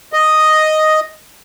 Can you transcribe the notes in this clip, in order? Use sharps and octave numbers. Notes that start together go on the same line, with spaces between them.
D#5